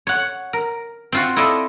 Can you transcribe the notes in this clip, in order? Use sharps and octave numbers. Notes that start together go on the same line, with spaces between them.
C#5 F#5
A#4
C4 F4 F#4
E4 F4 A4 D5 D#5